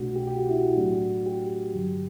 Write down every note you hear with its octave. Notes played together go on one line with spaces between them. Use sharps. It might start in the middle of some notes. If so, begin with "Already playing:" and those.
Already playing: C2 B2 A3 D4 F#4
G4
G4
F#4
E4
F#4
A2 F#3 A3 D4
G4
G2 D3 F#3